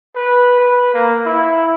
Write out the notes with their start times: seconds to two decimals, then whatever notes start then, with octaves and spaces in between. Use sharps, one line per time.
0.16 B4
0.60 B4
0.94 A#3
1.25 E4